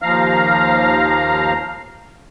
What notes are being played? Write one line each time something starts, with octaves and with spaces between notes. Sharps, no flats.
D#2 F3 F5 A#5 F6